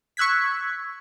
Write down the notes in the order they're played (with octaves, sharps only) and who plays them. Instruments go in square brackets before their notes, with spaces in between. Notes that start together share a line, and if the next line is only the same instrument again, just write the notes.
[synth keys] C#6 E6 F#6 G#6 B6